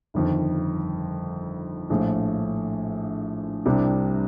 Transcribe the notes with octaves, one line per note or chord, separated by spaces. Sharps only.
G1 F2 D#3
A#1 A2 F3
C2 C3 G3 D4 G4